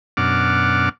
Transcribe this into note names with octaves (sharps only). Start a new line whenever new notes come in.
F#2 B2 D4 F#5 D6 F6